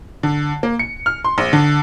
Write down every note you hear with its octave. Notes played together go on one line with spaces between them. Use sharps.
D3
A#3
C#7
F6
C6
A#1
D3